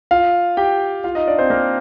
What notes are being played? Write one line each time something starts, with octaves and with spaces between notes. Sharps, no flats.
F4 F5
G4 G5
F4 F5
D#4 D#5
D4 D5
C4 C5
A#3 A#4